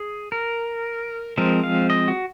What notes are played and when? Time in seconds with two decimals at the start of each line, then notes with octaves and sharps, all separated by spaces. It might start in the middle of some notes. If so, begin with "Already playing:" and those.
Already playing: G#4
0.32 A#4
1.37 F3 G#3 C4 A#4
1.64 F5
1.90 D#5
2.08 F#4